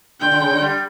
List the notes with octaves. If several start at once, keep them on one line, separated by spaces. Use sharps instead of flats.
D3 G5
D3
C#3
D3
G3